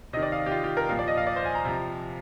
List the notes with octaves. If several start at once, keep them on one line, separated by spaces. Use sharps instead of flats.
C3 D#3 D#5
D5
F5
G4
F4
G4
A#4
A#2 F3 F5
D5
D#5
F5
D5
C5
G#5
A#5
C3 F3